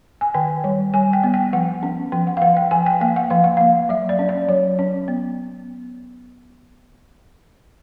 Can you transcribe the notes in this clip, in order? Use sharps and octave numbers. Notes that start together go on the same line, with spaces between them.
G#5
D#3 G5
G3
G3 G#5
G5
B3
G5
F3 F#5
C#4
F3 G5
F#5
F5
F3 F#5
G5
F3 G#5
G5
A#3 G5
F#5
F3 F5
F#5
A#3 F5
F#3 E5
D5
C#4
D5
F#3 C#5
C#4
B3